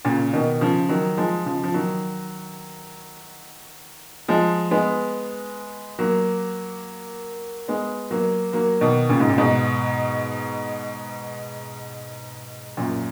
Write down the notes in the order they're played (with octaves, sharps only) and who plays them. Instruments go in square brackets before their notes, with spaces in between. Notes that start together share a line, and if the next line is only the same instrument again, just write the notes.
[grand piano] A#2 C#3
B2 D#3
C#3 F3
D#3 F#3
F3 G#3
C#3 F3
F3
D#3 F#3
F3 G#3
G#3 B3
F#3 A#3
G#3 B3
F#3 A#3
F#3 A#3
B2 D#3
A#2 C#3
G#2
A#2
G#2 B2
F#2 A#2